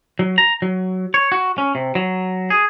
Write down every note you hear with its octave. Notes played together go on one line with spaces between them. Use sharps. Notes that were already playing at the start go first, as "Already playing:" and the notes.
F#3
A#5
F#3
C#5
F#4
C#4
C3
F#3
G#4